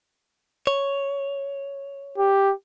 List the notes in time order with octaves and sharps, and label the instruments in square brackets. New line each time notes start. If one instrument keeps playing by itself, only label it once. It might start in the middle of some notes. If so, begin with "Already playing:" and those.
[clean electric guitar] C#5
[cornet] G4